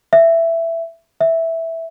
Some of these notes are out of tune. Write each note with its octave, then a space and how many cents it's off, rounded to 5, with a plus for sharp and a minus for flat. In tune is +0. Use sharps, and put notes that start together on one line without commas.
E5 +10
E5 -5